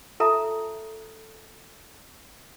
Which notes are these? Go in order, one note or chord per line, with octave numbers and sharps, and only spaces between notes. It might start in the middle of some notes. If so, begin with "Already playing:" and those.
F4 A4 E5 A5 A#5 D#6